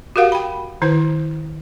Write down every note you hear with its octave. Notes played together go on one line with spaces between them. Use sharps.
F#4 G4 A#4 F5 F#5
G5 B5
D#3 E4 B4 C5